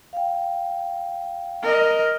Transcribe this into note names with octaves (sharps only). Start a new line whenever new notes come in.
F5 G5
A#4 D#5